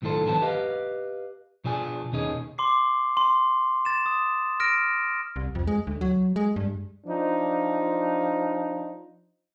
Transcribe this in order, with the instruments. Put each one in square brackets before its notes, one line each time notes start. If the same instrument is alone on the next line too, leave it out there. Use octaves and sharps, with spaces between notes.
[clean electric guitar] B1 A2 D#3 F3 A4 C5
D3 E3 F#3 B3 A5
G4 B4 D#5 F5
B2 F3 D4 G#4 G#5
D#2 B2 C#4 D#4 G#4 D#5
[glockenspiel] C6 D6 C7
C6
A6 E7
D#6
F6 A#6 D7
[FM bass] C2
F2
G#3
D2
F#3
G#3
G2
[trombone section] F3 D4 D#4